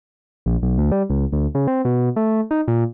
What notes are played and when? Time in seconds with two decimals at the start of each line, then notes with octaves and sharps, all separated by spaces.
0.46 A#1
0.63 B1
0.78 D2
0.92 G3
1.10 C#2
1.32 D2
1.55 C#3
1.68 C4
1.85 B2
2.16 A3
2.51 D#4
2.68 A#2